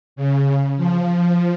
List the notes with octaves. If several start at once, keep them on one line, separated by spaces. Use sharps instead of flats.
C#3
F3